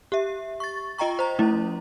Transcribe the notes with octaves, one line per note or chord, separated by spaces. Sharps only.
G4 E5
C#6 A6
F4 D#5 G5 A#5 C#6
C5 A#5
F3 A3 C#4 E4